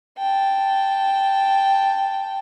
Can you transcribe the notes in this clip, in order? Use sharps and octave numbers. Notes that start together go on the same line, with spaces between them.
G5 A5